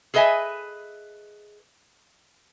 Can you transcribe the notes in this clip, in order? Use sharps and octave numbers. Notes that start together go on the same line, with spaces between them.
G#4 A4 B4 D#5 E5 G#5